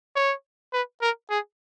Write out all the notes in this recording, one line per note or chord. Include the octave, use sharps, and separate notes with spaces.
C#5
B4
A#4
G#4